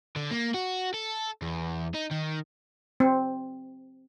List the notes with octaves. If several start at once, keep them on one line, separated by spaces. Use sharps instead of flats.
D3
A#3
F#4
A4
E2
D#4
D#3
C4